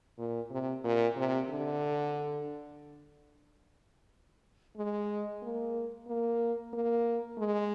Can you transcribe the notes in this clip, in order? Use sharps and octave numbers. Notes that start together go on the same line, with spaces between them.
A#2
C3
A#2
C3
D3
G#3
A#3
A#3
A#3
G#3